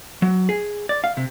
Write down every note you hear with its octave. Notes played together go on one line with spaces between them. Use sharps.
F#3
G#4
D5
F5
C3